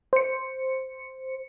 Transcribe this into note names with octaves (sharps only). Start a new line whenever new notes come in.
C5 C#7